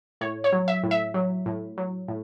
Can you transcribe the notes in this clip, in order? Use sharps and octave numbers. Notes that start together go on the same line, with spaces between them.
A2 C#5
C#5
F#3
E5
A2
E5
F#3
A2
F#3
A2